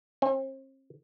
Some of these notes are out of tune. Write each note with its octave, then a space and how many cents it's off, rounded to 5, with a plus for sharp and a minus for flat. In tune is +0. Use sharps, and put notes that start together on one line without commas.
C4 +40